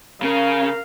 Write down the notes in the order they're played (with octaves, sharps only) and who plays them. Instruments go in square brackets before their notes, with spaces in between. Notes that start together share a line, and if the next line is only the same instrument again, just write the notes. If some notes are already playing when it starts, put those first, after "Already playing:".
[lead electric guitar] C#3 [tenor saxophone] A#4 [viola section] F5